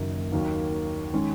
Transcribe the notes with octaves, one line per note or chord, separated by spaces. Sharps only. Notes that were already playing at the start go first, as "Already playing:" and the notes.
Already playing: F#1 F#2 D#3 F#3 A#3
D#2 D#3 F#3 A#3
D#3 G#3 C#4